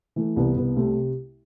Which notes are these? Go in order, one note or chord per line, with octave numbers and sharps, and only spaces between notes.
E3 A3
C2 B3
C2 B3
C3 A3